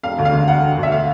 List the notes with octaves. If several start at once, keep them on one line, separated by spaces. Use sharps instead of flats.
E1 F5
D2
F5
D3
E1 F#5
E1
D2
E5
F5